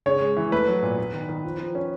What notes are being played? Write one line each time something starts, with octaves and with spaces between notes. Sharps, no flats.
C#3 C#5
G#3
E3
A3 B4
F#3
A#2
B3
D#3
D#3
F3
F3
C#4